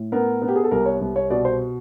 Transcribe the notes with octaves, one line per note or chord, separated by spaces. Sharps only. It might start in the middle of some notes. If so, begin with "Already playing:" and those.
Already playing: A2
B3 A#4
B3
G4
G#4
A4
C2 A#4
C#5
C2
C#5
B2 D5
C5